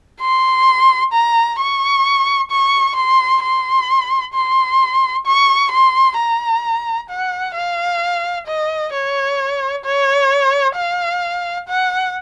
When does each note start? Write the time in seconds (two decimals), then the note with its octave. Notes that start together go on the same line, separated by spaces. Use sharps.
0.21 C6
1.13 A#5
1.59 C#6
2.51 C#6
2.96 C6
3.43 C6
4.34 C6
5.26 C#6
5.72 C6
6.18 A#5
7.10 F#5
7.56 F5
8.47 D#5
8.93 C#5
9.85 C#5
10.76 F5
11.68 F#5